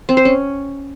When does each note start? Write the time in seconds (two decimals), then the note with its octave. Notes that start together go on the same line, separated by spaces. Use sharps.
0.09 C4
0.17 C5
0.25 C#4